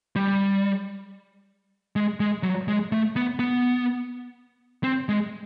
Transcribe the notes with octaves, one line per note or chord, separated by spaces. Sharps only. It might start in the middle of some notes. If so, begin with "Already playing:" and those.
G3
G#3
G#3
F#3
G#3
A3
B3
B3
C4
G#3